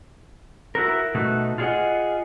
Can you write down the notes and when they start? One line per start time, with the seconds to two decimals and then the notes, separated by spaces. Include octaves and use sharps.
0.75 E4 F#4 A#4
1.14 B2 A3 D#4 F#4
1.58 F4 F#4 G#4 C#5 D#5 F#5